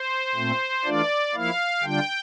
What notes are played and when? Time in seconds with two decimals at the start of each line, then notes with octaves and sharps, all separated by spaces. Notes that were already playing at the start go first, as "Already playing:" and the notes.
Already playing: C5
0.35 A#2 A3 C4
0.84 E3 A3 D4 F4 D5
1.33 F3 A#3 E4 F5
1.82 D3 G3 D4 F4 G5